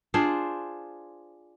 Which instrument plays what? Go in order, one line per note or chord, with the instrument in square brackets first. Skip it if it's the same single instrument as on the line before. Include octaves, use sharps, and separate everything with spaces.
[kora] D4 F4 G#4 C5